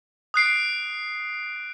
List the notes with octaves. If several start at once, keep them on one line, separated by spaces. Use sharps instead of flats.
D#6 F#6 C7 D7